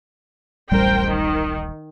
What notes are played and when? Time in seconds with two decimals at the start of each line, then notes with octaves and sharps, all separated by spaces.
0.71 D1 A1 G3 A#4 C5 G5
1.06 D#3